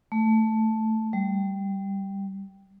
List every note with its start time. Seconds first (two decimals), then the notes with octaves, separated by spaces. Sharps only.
0.12 A3
1.13 G3